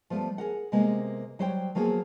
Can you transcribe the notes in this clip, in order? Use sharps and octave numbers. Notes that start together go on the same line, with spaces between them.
F3 G3 A3 B3
G#4 A#4 F#5
C3 G#3 A#3 B3
F#3 G3 C5 C#5 F5 G5
F3 F#3 A#3 B3 G#4